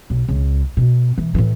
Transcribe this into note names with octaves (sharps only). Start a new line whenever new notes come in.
B1
C#2
B2
E3
A2 E3